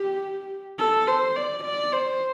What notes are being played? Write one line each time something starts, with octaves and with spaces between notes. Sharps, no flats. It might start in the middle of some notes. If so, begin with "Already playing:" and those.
Already playing: G4
A4
C5
D5
D5
C5